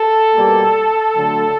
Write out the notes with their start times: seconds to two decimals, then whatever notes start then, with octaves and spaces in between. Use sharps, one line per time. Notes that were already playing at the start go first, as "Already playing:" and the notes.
Already playing: A4
0.35 B2 G3 A#3
1.15 D3 F#3 A3